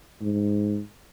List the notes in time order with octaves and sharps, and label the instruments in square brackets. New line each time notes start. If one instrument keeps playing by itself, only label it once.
[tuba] G#2